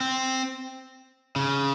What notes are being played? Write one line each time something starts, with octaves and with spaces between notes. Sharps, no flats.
C4
C#3